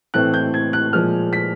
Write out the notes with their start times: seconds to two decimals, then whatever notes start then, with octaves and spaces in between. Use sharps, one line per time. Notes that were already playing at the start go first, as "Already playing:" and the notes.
0.14 A2 E3 A3 C4 F#6
0.34 G6
0.54 G#6
0.73 F#6
0.93 A#2 F3 G#3 F6
1.33 B6